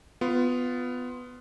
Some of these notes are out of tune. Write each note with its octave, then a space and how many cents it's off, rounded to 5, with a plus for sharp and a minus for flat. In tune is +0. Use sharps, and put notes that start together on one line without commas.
B3 +15 F4 +0